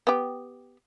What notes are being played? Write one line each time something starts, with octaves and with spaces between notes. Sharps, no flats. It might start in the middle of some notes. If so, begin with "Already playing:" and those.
B3 G4